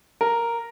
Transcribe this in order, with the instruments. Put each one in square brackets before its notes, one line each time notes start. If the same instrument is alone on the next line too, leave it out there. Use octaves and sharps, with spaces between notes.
[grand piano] A#4